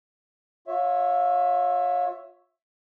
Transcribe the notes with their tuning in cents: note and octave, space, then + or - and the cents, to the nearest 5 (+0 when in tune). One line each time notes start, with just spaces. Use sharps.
F4 +35 C#5 +0 E5 +5